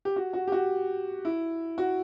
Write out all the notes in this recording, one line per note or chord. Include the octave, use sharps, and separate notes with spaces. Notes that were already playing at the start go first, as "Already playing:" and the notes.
G4
F#4
F#4
G4
F#4
E4
F#4